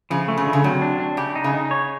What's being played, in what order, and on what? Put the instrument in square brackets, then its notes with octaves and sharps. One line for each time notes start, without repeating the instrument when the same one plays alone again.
[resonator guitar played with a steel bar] C#3 [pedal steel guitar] F3
[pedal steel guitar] A3
[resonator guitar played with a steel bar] C#3
[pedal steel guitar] D3
[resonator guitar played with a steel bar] C#3
[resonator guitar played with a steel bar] C3 [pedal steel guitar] F#3
[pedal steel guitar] D4
D4
[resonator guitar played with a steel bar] C#3 [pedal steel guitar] G4
[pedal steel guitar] D#4
[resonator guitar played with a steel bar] C#3
[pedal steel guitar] D#4
C#5